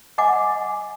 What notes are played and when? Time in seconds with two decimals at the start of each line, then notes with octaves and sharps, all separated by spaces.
0.18 D#5 F#5 G#5 D6